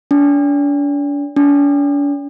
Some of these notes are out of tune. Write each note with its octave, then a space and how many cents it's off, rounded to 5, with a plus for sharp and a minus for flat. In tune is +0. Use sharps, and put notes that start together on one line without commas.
D4 -40
D4 -45